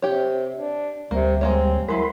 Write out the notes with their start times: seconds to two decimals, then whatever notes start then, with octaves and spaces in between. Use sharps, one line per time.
0.02 C3 G4 C#5
0.55 D4
1.11 D2 C3 G3 A#3
1.41 G#3 A#3 C4 C#5
1.88 F#3 G#3 E4 A#4 B5 C6